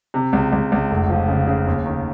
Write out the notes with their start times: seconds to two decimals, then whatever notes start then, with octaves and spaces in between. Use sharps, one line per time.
0.14 C3
0.33 C#2
0.52 C#2
0.72 C#2
0.91 F1
1.10 F3
1.28 C#3
1.48 C#3
1.67 D#2
1.86 D#3